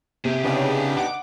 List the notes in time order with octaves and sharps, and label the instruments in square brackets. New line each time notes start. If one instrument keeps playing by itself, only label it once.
[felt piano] C3 [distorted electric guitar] G4 G#4
[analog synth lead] C#3 [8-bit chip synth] B3 D4 D#4
[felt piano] F#5 [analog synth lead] D6